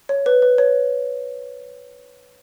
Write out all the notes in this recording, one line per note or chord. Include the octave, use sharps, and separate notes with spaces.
C#5
B4
B4
C#5